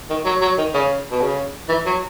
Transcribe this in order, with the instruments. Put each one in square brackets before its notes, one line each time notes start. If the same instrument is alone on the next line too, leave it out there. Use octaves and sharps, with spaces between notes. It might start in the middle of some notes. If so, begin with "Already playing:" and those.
[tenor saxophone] D#3
F#3
F#3
D#3
C#3
B2
C#3
E3
F#3